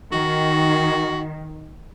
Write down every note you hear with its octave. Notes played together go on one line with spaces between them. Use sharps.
D#3 F#4